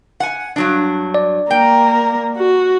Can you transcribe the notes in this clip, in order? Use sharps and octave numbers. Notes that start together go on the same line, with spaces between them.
F#5 G#5
G2 F#3 D4
D5
A#3 A#4 G5
F#4